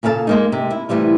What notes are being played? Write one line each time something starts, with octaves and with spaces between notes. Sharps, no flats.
A#2 C#3 A4 F5 A5
G#3 A#3 D#4
C3
E4
A2 C3 E3 G3 F4